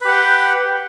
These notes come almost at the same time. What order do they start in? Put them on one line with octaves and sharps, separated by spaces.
B4 G4 F#5 G5